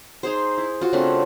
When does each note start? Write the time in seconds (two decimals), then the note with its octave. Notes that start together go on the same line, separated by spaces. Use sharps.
0.23 D#4 G#4 C5
0.58 E4
0.82 F4 F#4
0.93 C#3 A3 C4 D4